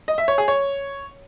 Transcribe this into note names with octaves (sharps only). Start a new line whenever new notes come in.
D#5
E5
C#5
G#4
C#5